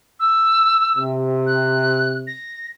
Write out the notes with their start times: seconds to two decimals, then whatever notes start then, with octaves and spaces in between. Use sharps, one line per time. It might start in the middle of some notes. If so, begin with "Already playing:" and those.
0.20 E6
0.96 C3
1.46 F#6
2.27 A#6